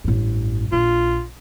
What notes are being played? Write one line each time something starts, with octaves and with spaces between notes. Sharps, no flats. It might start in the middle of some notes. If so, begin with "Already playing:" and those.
A1 G2
A#1 F4